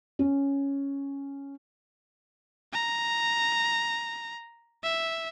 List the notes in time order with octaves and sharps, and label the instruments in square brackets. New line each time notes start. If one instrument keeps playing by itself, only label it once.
[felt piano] C#4
[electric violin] A#5
E5